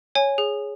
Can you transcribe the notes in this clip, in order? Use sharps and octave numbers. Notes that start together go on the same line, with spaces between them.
C#5 G#5
G#4